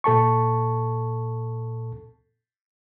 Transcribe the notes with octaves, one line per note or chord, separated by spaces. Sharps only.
A#2 A4 A5 C#6